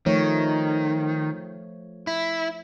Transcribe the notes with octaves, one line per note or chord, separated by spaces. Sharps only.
D#3 F3 A3 C#5
E4